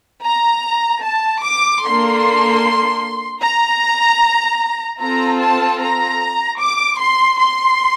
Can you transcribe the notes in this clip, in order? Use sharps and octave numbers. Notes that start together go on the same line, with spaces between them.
A#5
A5
D6
A#3 D4 A4 C6
A#5
C4 F4 A4 A#5
A5
A#5
D6
C6
C6